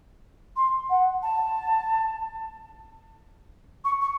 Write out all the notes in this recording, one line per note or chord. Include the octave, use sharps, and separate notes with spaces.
C6
F#5
A5
C#6
C#6